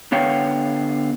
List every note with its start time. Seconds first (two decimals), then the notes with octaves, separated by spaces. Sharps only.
0.12 D3 B3 C#5 F5 G5